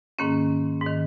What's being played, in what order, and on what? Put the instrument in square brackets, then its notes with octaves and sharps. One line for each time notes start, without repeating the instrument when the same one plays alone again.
[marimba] G#2 D#3 A#3 C#4
G#2
D#3